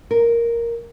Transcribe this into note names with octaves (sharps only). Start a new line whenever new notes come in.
A#4